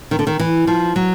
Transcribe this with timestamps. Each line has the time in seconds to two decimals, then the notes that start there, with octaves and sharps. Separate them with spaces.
0.11 D#3
0.19 D3
0.27 D#3
0.40 E3
0.67 F3
0.96 F#3